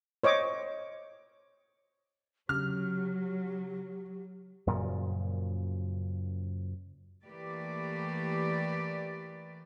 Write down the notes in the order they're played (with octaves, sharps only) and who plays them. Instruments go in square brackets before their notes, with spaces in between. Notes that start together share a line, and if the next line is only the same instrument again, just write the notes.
[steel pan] C5 C#5 D#5 D6
[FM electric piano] C#3 [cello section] F#3 [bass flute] G4 [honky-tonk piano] F6
[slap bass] F#2 A#2 C#3 F3
[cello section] E3 A3 A#3 G4 B4 D5